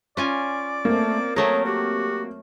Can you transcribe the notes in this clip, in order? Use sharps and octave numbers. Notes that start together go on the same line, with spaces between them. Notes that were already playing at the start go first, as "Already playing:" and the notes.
C#4 F4 D5 G#5
A3 A#3 C4
F#3 A3 G#4 A#4 C#5
F#4 G4